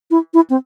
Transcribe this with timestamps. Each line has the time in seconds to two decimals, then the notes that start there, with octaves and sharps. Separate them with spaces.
0.11 E4
0.34 E4
0.50 C4